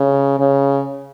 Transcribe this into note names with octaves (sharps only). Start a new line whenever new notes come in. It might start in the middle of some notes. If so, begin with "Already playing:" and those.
Already playing: C#3
C#3